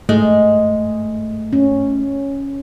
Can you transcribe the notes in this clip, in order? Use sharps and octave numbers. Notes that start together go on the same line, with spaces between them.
G#2 G#3 A3
C#4